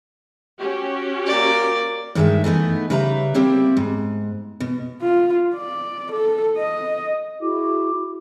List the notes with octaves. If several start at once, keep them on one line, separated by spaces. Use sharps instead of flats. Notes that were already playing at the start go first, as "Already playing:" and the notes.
C#4 F#4 G4
A#3 D5
G2 D#3 G#3 D#4 E5
E3 A3 B3 D#4
C#3 G3 B4 E5 A#5
G3 A#3 C4 E4 G4
G#2
B2
F4
D5
A4
D#5
E4 F#4 G#4 D6